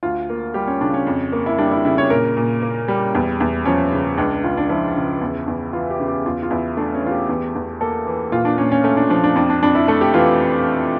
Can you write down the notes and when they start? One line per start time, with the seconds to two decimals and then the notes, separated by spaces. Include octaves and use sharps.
0.03 D2 F4
0.30 A#3
0.54 G3 G4
0.67 C#4
0.81 C#3 D4
0.94 C#4
1.07 F2
1.32 A#3
1.46 E4
1.58 G3 D4
1.71 E4
1.85 C#3 E4
1.98 C#5
2.10 A#2 A#4
2.37 A#2
2.62 A#3
2.88 G3
3.15 E2
3.40 E2
3.65 F3 C#4
3.93 C#3
4.17 C#2 D4
4.44 C#2 F4
4.57 D4
4.69 F3 E4
4.96 C#3
5.21 E2
5.47 E2
5.73 E3 F4
5.90 G4
6.00 C#3
6.08 G4
6.26 E2 F4
6.43 F4
6.51 E2 E4
6.77 A3 D4
6.95 C#4
7.03 E3 F4
7.11 G4
7.29 E2
7.55 E2
7.81 A#3 A4
8.07 E3
8.32 A#2 F4
8.45 D4
8.58 A#2 C#4
8.72 C#4
8.84 A3 C#4
8.97 D4
9.10 F3 D4
9.24 D4
9.36 F2 D4
9.50 D4
9.63 F2 D4
9.75 E4
9.88 A3 A4
10.01 G4
10.14 E3 F4